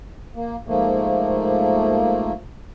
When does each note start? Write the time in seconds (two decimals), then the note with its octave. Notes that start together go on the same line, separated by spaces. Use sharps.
0.36 A#3
0.67 G#2 F3 A3 A#3